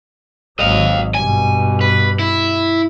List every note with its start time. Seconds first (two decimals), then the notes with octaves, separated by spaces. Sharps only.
0.59 G#1 F#3 D#5 F5
1.15 G2 B2 G#5
1.81 B4
2.19 E4